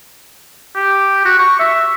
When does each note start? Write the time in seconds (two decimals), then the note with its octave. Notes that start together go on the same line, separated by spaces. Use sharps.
0.76 G4
1.25 F#4
1.39 C#6
1.60 E5